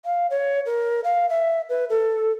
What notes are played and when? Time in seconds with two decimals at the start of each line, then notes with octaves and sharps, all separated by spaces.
0.05 F5
0.30 C#5
0.66 A#4
1.04 F5
1.29 E5
1.69 B4
1.90 A4